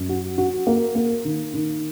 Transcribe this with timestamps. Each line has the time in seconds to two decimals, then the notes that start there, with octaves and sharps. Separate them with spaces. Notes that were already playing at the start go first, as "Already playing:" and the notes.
Already playing: F#2
0.09 F#4
0.38 F#4
0.67 A#3
0.95 A#3
1.25 D#3
1.54 D#3